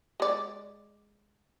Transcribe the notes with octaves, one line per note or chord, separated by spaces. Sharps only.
G#3 D5